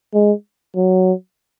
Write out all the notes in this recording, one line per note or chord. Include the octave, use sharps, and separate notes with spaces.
G#3
F#3